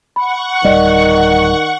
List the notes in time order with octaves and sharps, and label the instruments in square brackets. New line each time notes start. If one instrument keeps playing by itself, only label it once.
[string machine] F#5 C#6 [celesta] B5
[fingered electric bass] D1 B1 G3 [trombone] D#3 [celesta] D5 D#5